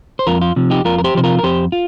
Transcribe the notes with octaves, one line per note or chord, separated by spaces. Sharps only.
C5
F2 F4 A#4
F4
C3 F3
D#4 G4
F2 F4 A#4
A#4
G4 C5
C3 F3 C5
F4 A#4
A#4
F2 G4 C5
F4